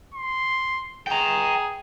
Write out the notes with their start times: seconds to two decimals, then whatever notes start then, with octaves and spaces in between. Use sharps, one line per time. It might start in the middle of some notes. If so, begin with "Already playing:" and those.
0.14 C6
1.07 G#4 G5 A#5